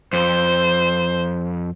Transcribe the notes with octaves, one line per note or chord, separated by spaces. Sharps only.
F2 C5